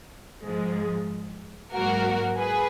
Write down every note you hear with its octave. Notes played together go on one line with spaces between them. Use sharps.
G#2 F3 G#3
G#2 F#3 A#3 F#4 A#4
G#4 B4